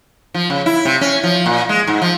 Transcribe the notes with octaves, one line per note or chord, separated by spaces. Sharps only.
F3
C#3
E4
C3
C#4
F3
A#2
G#3
G#2
F3